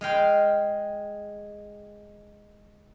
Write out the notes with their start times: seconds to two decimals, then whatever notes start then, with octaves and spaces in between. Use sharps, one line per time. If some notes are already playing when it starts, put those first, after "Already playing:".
0.01 G#3 F5 G5 C6